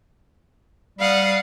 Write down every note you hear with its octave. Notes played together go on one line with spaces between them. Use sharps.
G3 F5 F#5 D#6